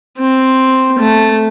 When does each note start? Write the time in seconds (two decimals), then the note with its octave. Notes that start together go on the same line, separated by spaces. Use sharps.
0.19 C4
0.99 A3